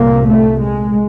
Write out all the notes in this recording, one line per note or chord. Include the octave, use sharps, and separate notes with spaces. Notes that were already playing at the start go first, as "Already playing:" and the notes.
Already playing: C2 A#2 A#3
A3
G#3